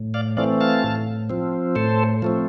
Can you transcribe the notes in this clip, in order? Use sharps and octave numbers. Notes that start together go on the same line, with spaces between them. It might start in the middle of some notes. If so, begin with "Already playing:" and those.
Already playing: A2
D5 F5
E3 A3 C4 D5 F5
F5 A5
A2
F3 C4
A2 A4 C5
F3 A3 C4